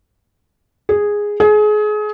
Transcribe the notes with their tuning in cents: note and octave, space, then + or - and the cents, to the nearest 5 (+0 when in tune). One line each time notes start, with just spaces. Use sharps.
G#4 -5
G#4 +30